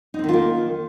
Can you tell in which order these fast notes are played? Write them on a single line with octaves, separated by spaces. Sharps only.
D#4 C4 D#3 F4 A#3